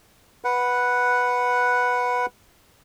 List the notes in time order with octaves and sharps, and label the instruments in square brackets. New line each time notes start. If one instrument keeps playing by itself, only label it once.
[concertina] B4 F#5